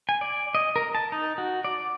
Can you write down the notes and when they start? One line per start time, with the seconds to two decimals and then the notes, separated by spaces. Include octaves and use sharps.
0.09 G#5
0.21 D5
0.55 D#5
0.76 A#4
0.95 A5
1.12 D#4
1.38 F#4
1.65 D5